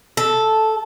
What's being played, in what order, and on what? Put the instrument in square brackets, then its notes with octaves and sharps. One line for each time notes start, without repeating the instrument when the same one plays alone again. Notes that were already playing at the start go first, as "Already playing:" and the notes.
[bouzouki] A4